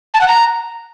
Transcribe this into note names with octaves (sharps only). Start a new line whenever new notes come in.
A5
F#5
A#5